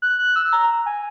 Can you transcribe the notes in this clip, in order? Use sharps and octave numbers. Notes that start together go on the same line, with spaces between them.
F#6
F#6
E6
A#5
G#5